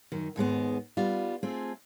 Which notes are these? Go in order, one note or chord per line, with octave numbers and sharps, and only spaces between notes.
F#2 D#3
D#2 G#2 G#3 B3
G3 B3 F4
A3 C4 F4 G#4